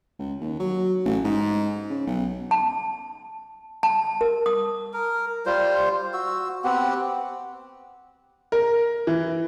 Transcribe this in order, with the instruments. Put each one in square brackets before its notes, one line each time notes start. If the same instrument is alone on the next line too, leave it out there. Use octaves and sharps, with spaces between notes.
[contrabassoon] C#2
D#2
F#3
A1
G#2
C#3
B1
[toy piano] A5
A5
A#4
D#6
[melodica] A#4
G3 F4 C5
F#4 E6
B3 C4 G4 F#5
[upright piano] A#4
E3